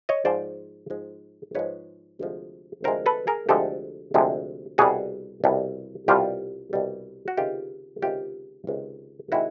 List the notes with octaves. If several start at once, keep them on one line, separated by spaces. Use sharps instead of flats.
C#5 D#5
G#2 F3 G#3 C5 D5
G#2 F3 G#3
G#2 F3 G#3 B4 C#5
D2 C3 F3 G#3
D2 C3 F3 G#3 A#4 C5
A4 B4
G#4 A#4
D2 C3 F3 G#3 G4 A4
D2 C3 F3 G#3
C2 B2 G3 F#4 G#4
C2 B2 G3
C2 B2 G3 F4 G4
C2 B2 G3
F#4
C#2 C3 D#3 G#3 F4 G4
C#2 C3 D#3 G#3 F4 G4
C#2 C3 D#3 G#3
C3 D#3 G#3 E4 F#4